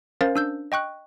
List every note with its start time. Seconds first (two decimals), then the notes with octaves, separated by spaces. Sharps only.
0.21 C#4 A#4 C5 F5 A6
0.36 D4 E6 G6
0.72 D#5 G5 C#6 F#6